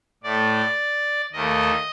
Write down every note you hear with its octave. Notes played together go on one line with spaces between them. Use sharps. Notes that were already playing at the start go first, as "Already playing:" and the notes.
A2 A3 D5
D#2 D#3 A3 D#5